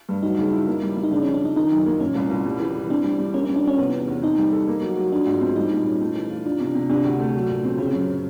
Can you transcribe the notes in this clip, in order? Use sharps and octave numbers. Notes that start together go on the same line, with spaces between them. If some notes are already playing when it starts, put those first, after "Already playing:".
G2
F#3 D#4
C#3
E4
A#3
G3
G3
D#4
C#3 D4
F2 C#4
D4
F2 D#4
D#3 D#4
F#2
A#3
A#2 C#4
C2
C2
G3
E3
E3
C4 D4
G3 D4
G3
A#3 C#4
G3 C#4
D4
C#4 F4
C3 B3
E2
E2
C4 D#4
G3
A4
A#3
F#3
F#3
F3 D4
G#2
C4
G3 D#4
A#2
C#4
A3
E3
F4
F3 D4
C3
D4
C3
C3 D4
D2
A3
F#3
A#2
C4
C#3 C#4
C4
F#2 C#4